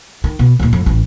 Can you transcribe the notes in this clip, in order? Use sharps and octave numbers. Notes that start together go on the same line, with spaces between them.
D#3
B2
D#2 A#2
F2
A1 E3